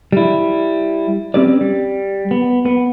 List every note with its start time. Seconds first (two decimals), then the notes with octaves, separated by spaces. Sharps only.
0.12 G3 E4
1.34 C4 C#4 G4 B4 D5
1.61 G3
2.31 B3
2.66 B3